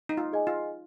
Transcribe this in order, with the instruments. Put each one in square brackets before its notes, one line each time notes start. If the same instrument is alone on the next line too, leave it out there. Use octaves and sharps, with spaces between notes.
[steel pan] D#4
F4
[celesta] G#4 D#5 G#5
[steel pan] F4